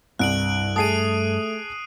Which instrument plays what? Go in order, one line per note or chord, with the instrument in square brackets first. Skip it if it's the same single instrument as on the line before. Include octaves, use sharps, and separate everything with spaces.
[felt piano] C2 [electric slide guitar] G2 [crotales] F#6 D7 F#7
[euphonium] A3 [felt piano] G#4 A5 [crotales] D#6 C7 D#7